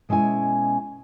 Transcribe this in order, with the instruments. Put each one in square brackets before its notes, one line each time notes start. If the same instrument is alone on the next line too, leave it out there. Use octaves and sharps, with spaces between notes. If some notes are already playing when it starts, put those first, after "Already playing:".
[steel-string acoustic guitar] B2 G#3 C#4 E4 G#5